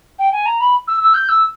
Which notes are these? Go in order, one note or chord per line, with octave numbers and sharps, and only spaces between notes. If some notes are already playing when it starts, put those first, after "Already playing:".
G5
G#5
A#5
B5
E6
E6
G6
E6